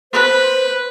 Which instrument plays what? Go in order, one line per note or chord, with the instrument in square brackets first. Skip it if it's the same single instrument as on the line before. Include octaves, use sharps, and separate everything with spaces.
[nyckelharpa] B4 [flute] C5